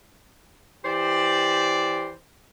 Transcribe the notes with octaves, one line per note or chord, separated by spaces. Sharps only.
E3 G4 C5 D5